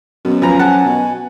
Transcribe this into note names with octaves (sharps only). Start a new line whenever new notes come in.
F#2 B2
F3 B4 G#5 A#5
F#5 G#5 A5
B2